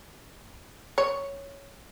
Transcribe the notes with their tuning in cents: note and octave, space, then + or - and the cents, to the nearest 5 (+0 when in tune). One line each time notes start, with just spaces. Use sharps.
C#5 +5